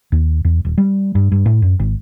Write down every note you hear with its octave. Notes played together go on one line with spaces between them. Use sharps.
D#2
E2
D#1
G3
G2
G2
A2
F#2
G#1